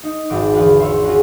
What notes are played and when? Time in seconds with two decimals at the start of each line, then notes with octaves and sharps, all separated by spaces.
0.03 D#4
0.30 D#1 G#1 F#3 D6
0.53 E2 D3 B4 F5 B5
0.80 C#5 E5 C6
1.04 C#4 F4 F#4 G#4